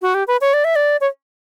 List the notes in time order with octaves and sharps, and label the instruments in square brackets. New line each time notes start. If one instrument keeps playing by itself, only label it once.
[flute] F#4
G4
B4
C#5
D5
E5
D5
C#5